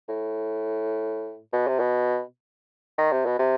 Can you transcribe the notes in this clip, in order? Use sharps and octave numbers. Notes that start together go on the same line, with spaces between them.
A2
B2
C3
B2
D#3
C3
B2
C3